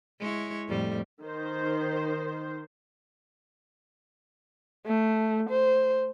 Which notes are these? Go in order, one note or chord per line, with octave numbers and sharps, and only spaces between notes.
G#3 E4 C#5
F2 A2 G3
D#3 C5
A3
C5